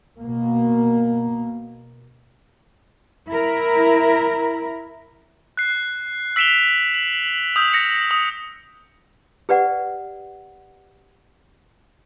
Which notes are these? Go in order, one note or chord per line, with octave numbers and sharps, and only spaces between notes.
B2 A#3
E4 A#4
F#6 C7
E6 B6 D7 E7 F7 G7
F#7
D#6 E6 G6
A#6 C#7
D#6
G4 B4 D5 F#5